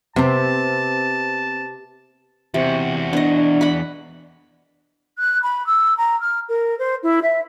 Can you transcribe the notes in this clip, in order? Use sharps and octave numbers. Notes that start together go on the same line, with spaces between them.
C3 B3 C4 A5
E2 C3 F#4
B3 D4 D#5
F#5 B5
F#6
B5
E6
A#5
F6
A#4
C5
E4
E5